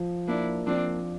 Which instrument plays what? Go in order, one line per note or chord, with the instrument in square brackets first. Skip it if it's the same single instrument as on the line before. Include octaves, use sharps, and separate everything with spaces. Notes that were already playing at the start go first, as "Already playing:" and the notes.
Already playing: [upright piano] F3
[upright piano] A#3 [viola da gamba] D4 E4
[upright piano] F3 [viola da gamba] C4 D4